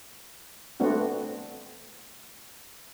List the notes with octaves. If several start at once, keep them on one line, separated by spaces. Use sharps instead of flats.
A3 B3 C4 D4 F#4